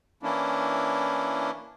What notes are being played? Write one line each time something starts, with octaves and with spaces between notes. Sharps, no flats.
E3 A#3 C#4 D4 E4